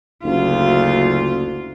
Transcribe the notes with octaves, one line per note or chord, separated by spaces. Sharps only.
F#1 D2 F4